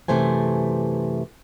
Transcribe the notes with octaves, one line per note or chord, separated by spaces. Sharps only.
F#2 C3 E3 A3 C5 G#5